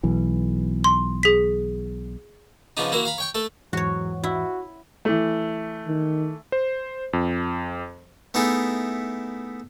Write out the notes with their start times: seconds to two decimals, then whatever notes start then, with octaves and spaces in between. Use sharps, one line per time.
0.03 B1 E3
0.84 C6
1.23 G#4 B6
2.77 C#3 F3 B3 D4 D#4
2.92 A#3 E4 F#4 A#4
3.05 F5 A#5 B5
3.18 C#5 G5 C#6
3.35 A3 A4
3.73 E2 G#2 E3 F#3 F#4 C#5
4.24 E4 F#4
5.05 E3 A3
5.87 D#3
6.52 C5
7.13 F2
8.34 A3 B3 D#4 E4 G#4 A4